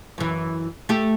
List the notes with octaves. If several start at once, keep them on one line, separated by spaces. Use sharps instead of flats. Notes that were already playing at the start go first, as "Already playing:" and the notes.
F#2 E3
A3 G4